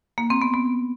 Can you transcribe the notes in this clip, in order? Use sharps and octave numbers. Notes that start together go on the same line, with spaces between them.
A#3
C4
B3
B3